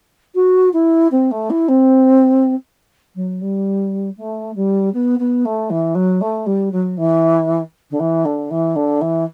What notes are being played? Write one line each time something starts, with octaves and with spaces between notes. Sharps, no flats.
F#4
E4
C4
A3
E4
C4
F#3
G3
A3
G3
B3
B3
A3
E3
F#3
A3
G3
F#3
E3
D3
E3
D3
E3
D3
E3